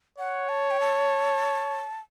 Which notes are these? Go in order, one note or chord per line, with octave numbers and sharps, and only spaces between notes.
C#5 F#5
A5
G5
A5